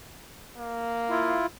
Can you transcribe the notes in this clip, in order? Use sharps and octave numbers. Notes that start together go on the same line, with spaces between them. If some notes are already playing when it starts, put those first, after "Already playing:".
A#3
E4 F4